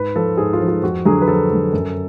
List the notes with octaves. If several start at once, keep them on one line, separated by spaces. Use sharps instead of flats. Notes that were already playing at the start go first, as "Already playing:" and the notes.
Already playing: G#2 B4
F3 A4
G#2 G#4
F4
F3
F4
F2 F#4
D3 F#3 G#4
B4
F2 A4
D3 F#3
F#2